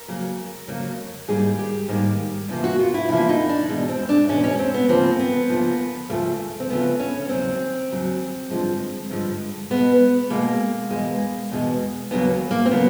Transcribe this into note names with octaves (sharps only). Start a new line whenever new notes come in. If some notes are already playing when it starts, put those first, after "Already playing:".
Already playing: A#4
F2 C#3 F#3 A#3
F2 C#3 F#3 A#3
G#2 D#3 G3 A#3 G#4
G4
G#2 D#3 G3 A#3
E2 C3 F3 A#3
F#4
F4
E4
E2 C3 F3 A#3 E4
D#4
D4
E2 B2 G#3
C4
D4
E2 B2 G#3 C#4
C#4
C4
B3
D2 C#3 F3 A#3 C4
B3
D2 C#3 F3 A#3
D2 C#3 F3 A3 A#3
C4
D2 C#3 F3 A3 B3
C#4
C#4
D#2 C#3 F#3 C4
D#2 C#3 F#3
G2 D3 F3 G#3
G2 D3 F3 G#3
B2 G#3 B3
B2 G#3 A#3
E2 B2 G#3
E2 B2 G#3
D#2 C#3 F#3 A#3 B3
A#3
C4
C#3 F#3 A#3 B3